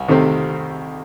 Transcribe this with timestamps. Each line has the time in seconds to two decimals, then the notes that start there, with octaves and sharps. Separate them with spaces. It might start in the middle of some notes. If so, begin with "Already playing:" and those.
Already playing: C2
0.08 C3 D#3 A3 C4